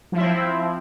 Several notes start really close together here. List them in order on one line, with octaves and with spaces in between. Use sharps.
F3 E4 C4